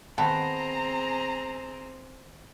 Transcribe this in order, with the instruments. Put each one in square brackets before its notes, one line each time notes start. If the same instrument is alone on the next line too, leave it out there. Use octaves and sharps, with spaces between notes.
[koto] D#3 B3 [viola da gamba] C4 G#4 [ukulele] A5 [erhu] A#5